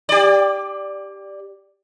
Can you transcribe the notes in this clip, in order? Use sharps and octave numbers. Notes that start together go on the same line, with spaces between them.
G4 D5